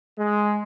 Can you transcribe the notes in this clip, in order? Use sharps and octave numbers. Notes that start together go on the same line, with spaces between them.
G#3